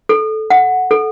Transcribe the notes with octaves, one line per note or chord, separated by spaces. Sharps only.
A4
F#5
A4